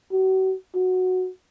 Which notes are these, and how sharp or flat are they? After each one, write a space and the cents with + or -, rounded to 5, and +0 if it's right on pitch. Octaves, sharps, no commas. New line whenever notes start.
F#4 +40
F#4 -5